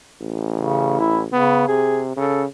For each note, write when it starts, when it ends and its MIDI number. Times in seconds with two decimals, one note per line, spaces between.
0.21 1.26 33
0.60 0.98 49
1.00 1.20 64
1.32 1.65 49
1.32 1.66 59
1.68 2.12 48
1.68 2.00 68
2.16 2.45 49
2.16 2.42 69